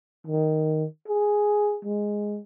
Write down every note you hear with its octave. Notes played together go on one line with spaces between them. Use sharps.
D#3
G#4
G#3